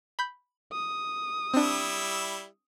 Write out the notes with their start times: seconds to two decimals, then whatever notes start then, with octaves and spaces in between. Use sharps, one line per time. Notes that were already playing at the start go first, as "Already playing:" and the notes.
0.19 B5 G6
0.73 D#6
1.54 G3 C4 D4 E4 E6